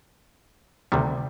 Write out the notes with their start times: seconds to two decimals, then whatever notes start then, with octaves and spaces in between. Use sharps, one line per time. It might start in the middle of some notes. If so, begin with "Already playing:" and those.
0.92 D2 C3 D#3 G3